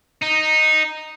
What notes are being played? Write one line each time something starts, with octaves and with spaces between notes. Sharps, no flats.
D#4